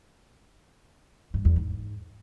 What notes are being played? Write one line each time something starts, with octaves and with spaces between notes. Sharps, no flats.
G2
E2
G#2